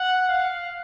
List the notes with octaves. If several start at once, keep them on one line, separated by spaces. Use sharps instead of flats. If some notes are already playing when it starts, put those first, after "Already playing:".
Already playing: F#5
F5